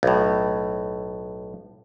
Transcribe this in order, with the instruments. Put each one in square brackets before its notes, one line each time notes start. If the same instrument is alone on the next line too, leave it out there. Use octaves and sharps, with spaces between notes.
[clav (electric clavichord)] B1 A2